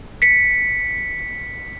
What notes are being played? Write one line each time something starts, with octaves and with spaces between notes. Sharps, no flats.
B6 C#7